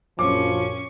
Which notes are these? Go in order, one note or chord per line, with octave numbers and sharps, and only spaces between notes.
A#1 F#2 F3 C#4 C#6 D6